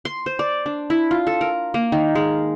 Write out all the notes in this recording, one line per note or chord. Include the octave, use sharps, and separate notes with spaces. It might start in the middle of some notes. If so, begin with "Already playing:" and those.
C6
C5
D5
D4
E4
F4
A4
A#4
A#3
D#3
G#3